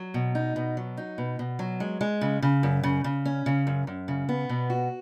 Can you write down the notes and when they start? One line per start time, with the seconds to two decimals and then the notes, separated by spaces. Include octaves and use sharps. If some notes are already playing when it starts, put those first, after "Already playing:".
Already playing: F#3
0.14 B2
0.35 D#4
0.56 B2
0.77 F#3
0.97 D#4
1.18 B2
1.39 B2
1.59 F#3
1.80 G#3
2.01 G#3
2.21 C#3
2.42 C#3
2.63 F#2
2.83 C#3
3.04 C#3
3.25 C#4
3.46 C#3
3.67 F#2
3.87 F#2
4.08 C#3
4.29 B3
4.49 B2
4.70 F#4